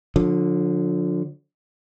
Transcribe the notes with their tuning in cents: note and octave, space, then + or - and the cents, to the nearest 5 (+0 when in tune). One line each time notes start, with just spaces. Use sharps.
D3 +0 F3 +35